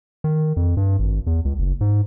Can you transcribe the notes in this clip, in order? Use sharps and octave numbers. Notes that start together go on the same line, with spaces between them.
D#3
F2
G2
G#1
E2
C#2
F#1
G#2